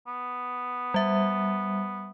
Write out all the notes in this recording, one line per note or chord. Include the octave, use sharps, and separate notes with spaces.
B3
G3 E5